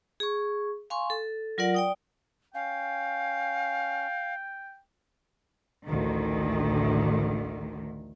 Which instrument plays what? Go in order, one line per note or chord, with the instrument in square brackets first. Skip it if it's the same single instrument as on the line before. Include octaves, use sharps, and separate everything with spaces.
[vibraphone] G#4 C#6
F5 G#5 C6 C#6
A4
F#3 F4 A#4 D5 F#5
D5 G5 D#6
[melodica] C#4 [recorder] F5 [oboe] G5
[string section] A1 D2 D#3